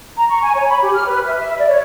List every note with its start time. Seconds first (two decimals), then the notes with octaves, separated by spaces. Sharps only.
0.17 A#5
0.30 C#6
0.42 G#5
0.55 C#5
0.67 B5
0.81 G4
0.93 F6
1.07 B4
1.26 E5
1.39 E5
1.58 D5
1.69 C#5